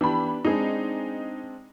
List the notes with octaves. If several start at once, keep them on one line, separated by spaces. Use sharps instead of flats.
E3 B3 D4 G4 B5
G#3 C4 D4 D#4 G#4